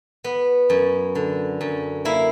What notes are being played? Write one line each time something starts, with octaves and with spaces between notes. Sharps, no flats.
B3
F#2
D3
F#2
A#3 E4